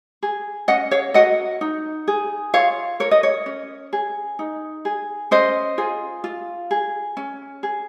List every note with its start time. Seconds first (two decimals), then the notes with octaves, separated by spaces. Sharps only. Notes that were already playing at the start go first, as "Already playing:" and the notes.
0.23 G#4
0.68 C#4 D#5 F#5
0.91 C#5 F5
1.14 F#4 A#4 D#5 F#5
1.61 D#4
2.08 G#4
2.54 F4 C#5 F5
3.00 A#4 C#5
3.11 D#5
3.23 C#5
3.46 C#4
3.93 G#4
4.39 D#4
4.85 G#4
5.31 C#4 C5 D#5
5.78 F4 G#4
6.24 F4
6.71 G#4
7.17 C#4
7.63 G#4